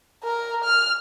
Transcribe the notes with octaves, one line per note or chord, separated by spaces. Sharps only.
A#4
F6